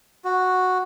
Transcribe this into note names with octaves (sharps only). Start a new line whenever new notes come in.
F#4